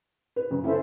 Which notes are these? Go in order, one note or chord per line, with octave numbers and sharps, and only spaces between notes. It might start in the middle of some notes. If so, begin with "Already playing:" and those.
B4
F#2 C#3
C#4 E4 A4 C5 E5